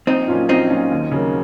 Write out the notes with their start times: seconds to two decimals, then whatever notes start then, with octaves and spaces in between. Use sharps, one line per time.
0.07 A#1 C4 D#4
0.28 A#2 F#3 C#4 F4
0.49 A#1 C4 D#4
0.70 A#2 F#3 C#4 F4
0.91 D#2
1.11 C#3 F#3 A#3